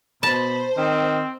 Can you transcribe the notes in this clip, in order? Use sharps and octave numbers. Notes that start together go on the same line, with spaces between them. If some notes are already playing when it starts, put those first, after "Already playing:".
B2 C5 A5 B5
D#3 C4